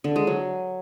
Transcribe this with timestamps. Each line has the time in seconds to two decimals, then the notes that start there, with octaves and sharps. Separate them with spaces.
0.04 D3
0.16 G#3
0.27 F#3